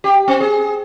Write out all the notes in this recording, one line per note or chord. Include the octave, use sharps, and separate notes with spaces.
G4
C4
G#4